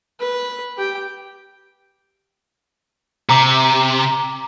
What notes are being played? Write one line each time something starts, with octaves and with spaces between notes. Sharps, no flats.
B4
G4 G5
C3 A#5 D6